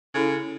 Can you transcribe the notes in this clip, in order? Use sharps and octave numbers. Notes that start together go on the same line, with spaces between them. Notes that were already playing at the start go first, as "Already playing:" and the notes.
C#3 E4 A4